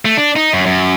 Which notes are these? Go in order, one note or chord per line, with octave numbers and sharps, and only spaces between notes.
A3
D4
D#4
F#2
F#2